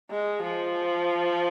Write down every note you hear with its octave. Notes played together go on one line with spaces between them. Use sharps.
G#3
F3